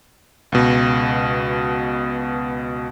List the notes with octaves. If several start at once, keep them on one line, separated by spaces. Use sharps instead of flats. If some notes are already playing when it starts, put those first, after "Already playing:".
C#2 B2